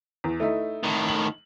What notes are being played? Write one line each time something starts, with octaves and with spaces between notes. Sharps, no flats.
E2
A3 D#4 E4
A2 D#3
F#7